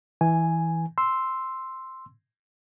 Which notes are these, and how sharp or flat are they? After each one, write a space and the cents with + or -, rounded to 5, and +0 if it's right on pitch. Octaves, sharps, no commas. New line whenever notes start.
E3 -10 G#5 +0
C6 +0 E6 +0